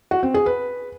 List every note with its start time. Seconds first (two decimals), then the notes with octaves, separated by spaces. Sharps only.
0.11 F#4
0.23 C4
0.34 G#4
0.46 B4